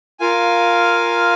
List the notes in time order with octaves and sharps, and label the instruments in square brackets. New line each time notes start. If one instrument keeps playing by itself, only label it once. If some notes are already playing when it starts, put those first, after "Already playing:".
[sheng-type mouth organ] F4 A#4 F5 G#5